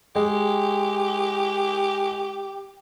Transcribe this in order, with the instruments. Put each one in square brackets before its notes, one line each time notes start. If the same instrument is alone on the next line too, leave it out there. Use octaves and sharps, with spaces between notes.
[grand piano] G#3 [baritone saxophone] G4